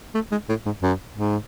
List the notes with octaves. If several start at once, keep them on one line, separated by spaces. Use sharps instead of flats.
A3
G#3
A2
G#2
F#2
G#2